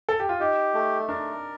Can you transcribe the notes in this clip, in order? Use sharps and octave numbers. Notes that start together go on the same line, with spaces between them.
A4
G4
F4
D#4 G4
A3
D4 A#4